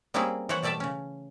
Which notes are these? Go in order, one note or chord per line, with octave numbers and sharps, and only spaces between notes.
G3 A#3 C4 C#4 E4 G#4
E3 C5 C#5 F#5
B2 G3 A3 D5 E5 A5
C#3 C#4